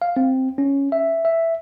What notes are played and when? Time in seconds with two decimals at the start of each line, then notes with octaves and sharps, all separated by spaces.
0.02 F5
0.17 C4
0.58 C#4
0.92 E5
1.25 E5